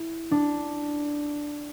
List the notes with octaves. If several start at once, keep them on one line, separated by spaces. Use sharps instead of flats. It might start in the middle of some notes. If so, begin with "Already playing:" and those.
Already playing: E4
D4